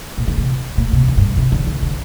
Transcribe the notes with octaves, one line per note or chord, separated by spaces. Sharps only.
A#2
D3
C3
A#2
C3
D3
G2
C3
D3
D3
D3